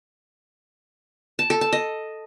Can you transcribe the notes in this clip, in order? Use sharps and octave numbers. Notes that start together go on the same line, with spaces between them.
A5
A4
A5
D#5